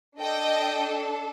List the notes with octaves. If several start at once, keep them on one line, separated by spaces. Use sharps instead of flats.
D4 A4 D#5 G5